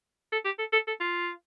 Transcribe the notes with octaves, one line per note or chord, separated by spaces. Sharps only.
A4
G4
A4
A4
A4
F4